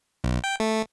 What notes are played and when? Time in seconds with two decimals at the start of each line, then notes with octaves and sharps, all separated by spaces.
0.24 B1
0.44 G5
0.60 A3